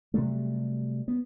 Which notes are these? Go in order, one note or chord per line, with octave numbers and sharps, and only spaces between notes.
C3 F#3 G3 A3
B3